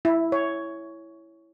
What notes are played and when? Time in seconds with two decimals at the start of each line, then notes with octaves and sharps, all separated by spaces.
0.05 E4
0.32 C#5